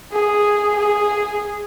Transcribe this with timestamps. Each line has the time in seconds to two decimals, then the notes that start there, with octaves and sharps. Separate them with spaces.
0.12 G#4
0.77 G#4